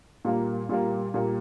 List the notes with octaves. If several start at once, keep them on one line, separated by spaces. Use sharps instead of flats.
A#2 G3 A#3
A#2 G3 A#3
A#2 G3 A#3